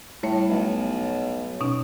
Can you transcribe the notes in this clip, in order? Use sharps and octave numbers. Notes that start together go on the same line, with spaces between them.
A2 G3 A3 C#5
B1
B2 C#4 D#4